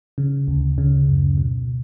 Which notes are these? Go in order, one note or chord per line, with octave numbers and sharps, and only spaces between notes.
C#3
D2
C#3
F#2
B2